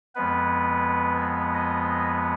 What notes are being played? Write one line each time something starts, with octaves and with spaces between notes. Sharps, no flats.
F2 F3 G#3 B3 B4
D#5